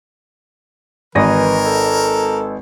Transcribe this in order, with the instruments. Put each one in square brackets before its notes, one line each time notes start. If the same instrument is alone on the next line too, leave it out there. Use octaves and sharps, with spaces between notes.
[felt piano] G#1 A#6 [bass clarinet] E3 [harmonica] A#4 [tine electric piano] B4 D#5 G#5
[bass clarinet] A4